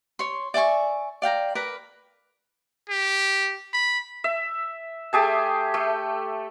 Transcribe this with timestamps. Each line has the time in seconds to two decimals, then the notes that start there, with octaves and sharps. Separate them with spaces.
0.19 C#5 C6
0.54 D5 E5 G#5 C#6
1.22 D5 F5 G5 A#5
1.55 A#4 B4 B5 D6
2.90 G4
3.73 B5
4.24 E5
5.13 A3 G4 G#4 A5
5.74 A3